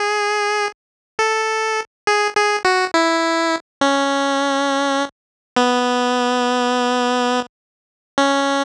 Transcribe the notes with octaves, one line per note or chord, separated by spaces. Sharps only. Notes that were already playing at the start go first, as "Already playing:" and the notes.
Already playing: G#4
A4
G#4
G#4
F#4
E4
C#4
B3
C#4